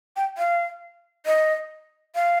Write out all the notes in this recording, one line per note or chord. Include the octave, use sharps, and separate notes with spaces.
G5
F5
D#5
F5